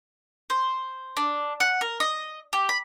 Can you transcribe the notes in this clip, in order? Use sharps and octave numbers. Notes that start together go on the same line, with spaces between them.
C5
D4
F#5
A#4
D#5
G4
B5